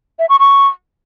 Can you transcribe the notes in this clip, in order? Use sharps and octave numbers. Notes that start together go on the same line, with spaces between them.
E5
C#6
C#6